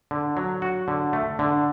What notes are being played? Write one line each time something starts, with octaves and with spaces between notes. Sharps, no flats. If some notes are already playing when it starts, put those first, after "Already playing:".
D3
F#3
F#4
D3
A3
D3